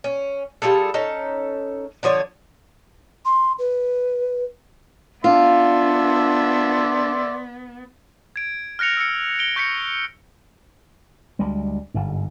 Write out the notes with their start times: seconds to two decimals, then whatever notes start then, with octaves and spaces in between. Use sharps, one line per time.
0.04 C#4
0.62 G3 F4 G#4 A4
0.94 C#4 D#4 A4
2.03 D3 F3 C#5 D5
3.25 C6
3.59 B4
5.24 B3 D4 F4 D5 E5 C6
8.36 G#6 D7
8.79 F6 F#6 A#6 C#7 F7
8.97 E6 C#7
9.39 D7 G7
9.56 C#6 G6 A#6 B6 C#7
11.39 D2 G3 G#3
11.94 G1 G#2